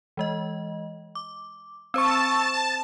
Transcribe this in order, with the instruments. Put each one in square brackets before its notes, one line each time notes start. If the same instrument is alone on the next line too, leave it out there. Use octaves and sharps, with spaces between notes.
[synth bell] E3 G#3 D#5
D6
[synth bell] C4 C5 [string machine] A5 [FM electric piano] C#6 E6